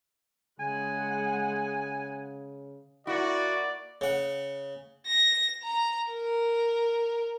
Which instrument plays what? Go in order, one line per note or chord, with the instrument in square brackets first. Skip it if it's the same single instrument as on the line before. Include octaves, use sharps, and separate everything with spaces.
[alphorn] C#3 [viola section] G#3 F#5 [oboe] G#5
[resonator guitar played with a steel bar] A#3 E4 [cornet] F#4 [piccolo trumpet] D5
[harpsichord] C#3 F#5
[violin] A#6
A#5
A#4